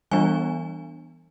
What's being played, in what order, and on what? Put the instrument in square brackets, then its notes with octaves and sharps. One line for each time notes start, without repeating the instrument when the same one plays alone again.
[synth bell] E3 G3 B3 D4 G#5